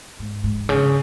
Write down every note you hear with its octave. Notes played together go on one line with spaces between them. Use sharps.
G#2
G#2
C#3